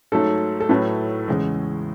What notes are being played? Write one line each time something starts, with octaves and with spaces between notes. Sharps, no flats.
G#2 F#3 A3 A4
A4
A2 F#3 A3 B4
E2 C#3 G#3